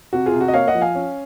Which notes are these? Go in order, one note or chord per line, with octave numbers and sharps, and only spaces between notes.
C3 F#4
F4 G#4
C3
F#4
D#5
A#3 C#5 F5
D#5 F#5
F3
F5 G#5
C#4